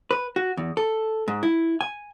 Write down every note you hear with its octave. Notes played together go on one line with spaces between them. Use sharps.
B4
F#4
E2
A4
G#2
E4
G#5